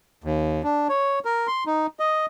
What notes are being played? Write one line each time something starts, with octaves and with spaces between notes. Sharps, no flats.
D#2
D4
C#5
A#4
C6
D#4
D#5